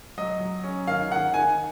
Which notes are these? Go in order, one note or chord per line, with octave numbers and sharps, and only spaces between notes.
F#3 D#5
F#3
C#4
D#3 F5
D#3 F#5
D#3 G#5